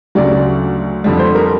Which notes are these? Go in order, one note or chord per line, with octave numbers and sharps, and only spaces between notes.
D2 C#3 F#3 D5
F2 D3 G3
C5
A#4